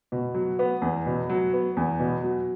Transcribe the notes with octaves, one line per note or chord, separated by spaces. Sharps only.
B2
F#3
B3
E2
B2
F#3
B3
E2
B2
F#3